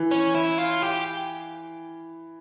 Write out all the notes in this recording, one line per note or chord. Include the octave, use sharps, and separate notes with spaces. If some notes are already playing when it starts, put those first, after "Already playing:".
Already playing: E3
C#4
E4
F4
G4